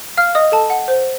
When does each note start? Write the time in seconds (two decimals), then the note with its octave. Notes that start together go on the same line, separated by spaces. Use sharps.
0.17 F5 F6
0.35 D#5 D#6
0.52 A4 A5
0.70 F#5
0.88 C5